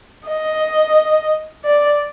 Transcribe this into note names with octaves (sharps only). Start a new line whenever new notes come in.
D#5
D5